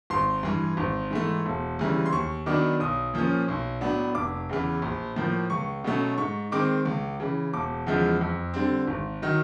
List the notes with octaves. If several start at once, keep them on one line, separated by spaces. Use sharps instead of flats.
G#1 C6
G2 E3
G#1
G#2 E3 A3
E1
D2 C#3 E3 G3
C6
D#2 C#6
D#3 F#3 B3 D4 D6
B1 D#6
A#2 F3 A#3 C#4
B1
A2 F#3 B3 D4
F1 D6
E2 C#3 E3
A#1
A2 F3 A#3
C#2 C#6
B2 F#3 A3 C#4
G#2 C#6
D#3 G#3 C4 D6
C#2
C#3 E3
E1 D6
E2 C#3 F3 G#3
F2
D3 G3 C4
G#1
D#3 F#3